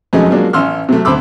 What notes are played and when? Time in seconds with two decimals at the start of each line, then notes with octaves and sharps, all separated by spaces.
0.13 F2 F#3 G#3 A3 C#4 D#4
0.30 F3 F#3 G#3 A#3 D4
0.53 A1 C#4 C6 E6 F6
0.89 C3 F#3 A3
1.05 D2 C4 B5 C6 D6 E6